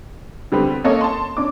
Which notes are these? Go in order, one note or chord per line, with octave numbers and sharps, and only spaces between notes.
D3 G3 B3 C4
A#3 C#4 A4 C#5 D#5
A5 C6
C#4 D4 D6